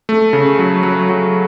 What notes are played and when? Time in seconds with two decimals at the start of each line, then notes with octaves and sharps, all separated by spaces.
0.09 A3
0.33 C#3
0.59 F#3
0.83 F#3
1.09 F#3